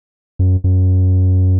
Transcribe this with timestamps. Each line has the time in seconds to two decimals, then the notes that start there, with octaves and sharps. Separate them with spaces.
0.39 F#2
0.64 F#2